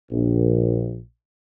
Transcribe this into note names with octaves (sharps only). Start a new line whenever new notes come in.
A#1